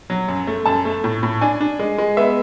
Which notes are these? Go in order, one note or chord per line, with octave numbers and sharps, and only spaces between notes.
F#3
F#2
A3
F#2 A5
A3
A2
A2
D4 G#5
D4
G#3
G#3
B3 E5